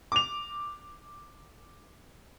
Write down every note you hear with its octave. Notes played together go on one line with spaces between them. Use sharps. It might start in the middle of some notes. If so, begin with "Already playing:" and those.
D6 F7